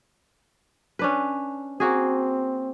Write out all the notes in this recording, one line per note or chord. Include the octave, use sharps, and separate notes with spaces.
C#4 D4 B4
A#3 C4 F#4 G#4